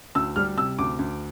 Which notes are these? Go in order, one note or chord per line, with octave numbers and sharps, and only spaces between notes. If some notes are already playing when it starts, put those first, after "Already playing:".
D2 E6
G3 F6
C3 E6
D2 D6
D2